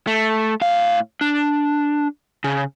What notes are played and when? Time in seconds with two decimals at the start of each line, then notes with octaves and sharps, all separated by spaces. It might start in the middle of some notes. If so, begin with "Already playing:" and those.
0.07 A3
0.61 A2 F5
1.21 D4
2.44 C#3